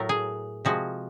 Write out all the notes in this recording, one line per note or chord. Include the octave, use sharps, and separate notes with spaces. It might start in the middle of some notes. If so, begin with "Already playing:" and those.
Already playing: A2 F#3 A3 A#4
G#4
C3 F3 G#3 F#4